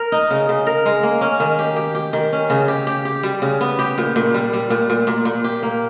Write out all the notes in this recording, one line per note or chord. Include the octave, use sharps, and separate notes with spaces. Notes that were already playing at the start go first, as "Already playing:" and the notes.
Already playing: A#4
D#4
C#3
C#3
A#4
G#3
A#3
C#4
D#3
G4
G4
G4
D#3
C#4
C#3
G4
G4
G4
G3
C#3
B3
G4
A#2
A#2
G3
G3
A#2
A#2
A#2
A#2
G4
A#3